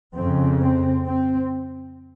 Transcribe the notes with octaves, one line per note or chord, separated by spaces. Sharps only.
F2 C#3 C4
C4
C4